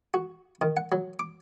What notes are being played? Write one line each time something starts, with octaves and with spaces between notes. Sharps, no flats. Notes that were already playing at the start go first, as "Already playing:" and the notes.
F#4
D#3
F#5
F#3
D6